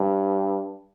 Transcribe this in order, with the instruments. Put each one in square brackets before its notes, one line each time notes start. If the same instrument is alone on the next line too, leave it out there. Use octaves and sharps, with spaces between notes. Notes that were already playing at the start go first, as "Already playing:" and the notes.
Already playing: [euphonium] G2